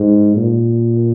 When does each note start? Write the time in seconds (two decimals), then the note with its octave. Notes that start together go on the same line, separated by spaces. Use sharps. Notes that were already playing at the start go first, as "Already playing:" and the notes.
Already playing: G#2
0.37 A#2